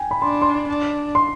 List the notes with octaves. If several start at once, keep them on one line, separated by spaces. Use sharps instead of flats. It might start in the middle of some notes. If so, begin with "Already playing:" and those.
Already playing: G5 G#5
B5
D4 C6
C6
D4
C6